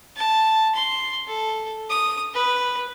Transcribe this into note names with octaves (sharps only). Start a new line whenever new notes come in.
A5
C6
A4
D#6
B4